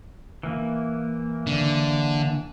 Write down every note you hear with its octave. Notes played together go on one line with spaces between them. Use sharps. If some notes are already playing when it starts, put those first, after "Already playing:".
E3 A#3
D3